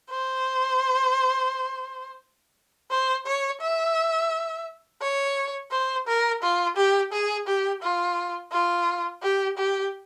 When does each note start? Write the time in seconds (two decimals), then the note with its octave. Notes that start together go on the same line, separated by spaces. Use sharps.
0.10 C5
2.91 C5
3.26 C#5
3.62 E5
5.02 C#5
5.71 C5
6.07 A#4
6.42 F4
6.76 G4
7.12 G#4
7.47 G4
7.82 F4
8.52 F4
9.23 G4
9.57 G4